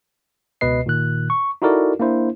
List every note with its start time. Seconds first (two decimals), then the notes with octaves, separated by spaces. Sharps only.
0.61 C#2 B2 B4 D#5 C7
0.86 A#2 D#3 F#6
1.30 C#6
1.62 D#4 E4 F#4 A4 A#4 D5
2.00 A#3 D4 E4 C5